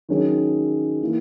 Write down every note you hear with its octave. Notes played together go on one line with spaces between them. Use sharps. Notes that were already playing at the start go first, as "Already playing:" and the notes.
D#3 F#3 C#4 G#4
E3 A#3 E4